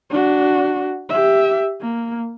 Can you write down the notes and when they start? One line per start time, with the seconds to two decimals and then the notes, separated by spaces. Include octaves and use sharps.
0.10 D4 F#4
1.09 G4 E5
1.82 A#3